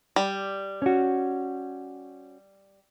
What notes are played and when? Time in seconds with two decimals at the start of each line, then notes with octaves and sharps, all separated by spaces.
0.16 G3
0.82 C#4 F#4